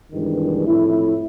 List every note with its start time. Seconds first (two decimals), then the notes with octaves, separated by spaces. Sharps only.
0.12 C2 G2 D#3 E3 G#3
0.65 F2 A2 E4